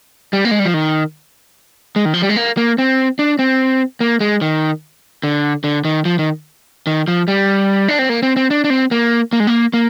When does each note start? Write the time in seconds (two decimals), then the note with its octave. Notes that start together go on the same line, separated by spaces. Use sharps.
0.33 G3
0.45 A#3
0.51 G#3
0.59 G3
0.66 F3
0.74 D#3
1.96 G#3
2.05 D#3
2.14 F3
2.22 G3
2.29 G#3
2.36 A#3
2.57 A#3
2.78 C4
3.19 D4
3.39 C4
4.00 A#3
4.20 G#3
4.41 D#3
5.23 D3
5.64 D3
5.85 D#3
6.05 F3
6.19 D#3
6.87 D#3
7.08 F3
7.28 G3
7.88 D4
7.99 C4
8.09 A#3
8.23 C4
8.36 C4
8.51 D4
8.64 D4
8.70 C4
8.91 A#3
9.33 A#3
9.40 G#3
9.47 A#3
9.73 A#3